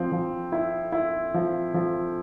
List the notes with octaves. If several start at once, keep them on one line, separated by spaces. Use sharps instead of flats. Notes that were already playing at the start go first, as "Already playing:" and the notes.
Already playing: F3 C4
F3
E4
E4
F3
F3